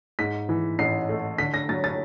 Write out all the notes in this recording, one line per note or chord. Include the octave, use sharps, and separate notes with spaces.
G#2 B6
E3
A1 C7
A3
D3 B6
A#6
F#3 A6
A6